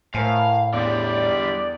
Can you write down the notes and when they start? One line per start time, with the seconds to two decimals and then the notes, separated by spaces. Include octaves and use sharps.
0.14 A2 A#4 C5 F5 G#5
0.74 E2 D3 G3 D5